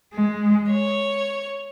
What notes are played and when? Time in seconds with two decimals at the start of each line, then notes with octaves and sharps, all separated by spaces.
0.15 G#3
0.71 C#5